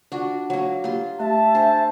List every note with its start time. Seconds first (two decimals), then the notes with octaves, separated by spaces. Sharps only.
0.12 D4 F4 F#4
0.50 F#3 A#3
0.84 A#3 F4 G4 C6
1.20 A3 G4 E5 A5
1.55 D4 C5 G#5